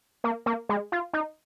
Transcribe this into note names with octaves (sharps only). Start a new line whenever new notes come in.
A#3
A#3
G#3
F4
D#4